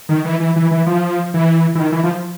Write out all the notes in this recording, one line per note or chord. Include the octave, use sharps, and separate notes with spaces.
D#3
E3
E3
E3
E3
F3
E3
E3
D#3
E3
F3